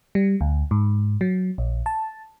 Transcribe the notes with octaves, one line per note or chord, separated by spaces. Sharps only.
G3
D2
G#2
F#3
A#1
A5